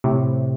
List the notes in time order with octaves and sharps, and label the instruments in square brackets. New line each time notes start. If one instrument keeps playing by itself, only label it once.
[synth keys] A2 C3